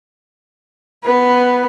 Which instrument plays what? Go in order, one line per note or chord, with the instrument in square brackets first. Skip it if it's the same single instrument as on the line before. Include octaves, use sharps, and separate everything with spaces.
[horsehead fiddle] B3 B4